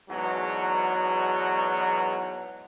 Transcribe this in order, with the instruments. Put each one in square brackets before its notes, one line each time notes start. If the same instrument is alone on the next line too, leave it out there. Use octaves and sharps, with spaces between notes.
[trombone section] E2 G#2 B2 F#3